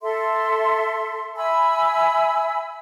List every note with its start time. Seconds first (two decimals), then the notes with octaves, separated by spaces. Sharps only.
0.02 A4 E5 C6
1.37 E5 G#5 B5 E6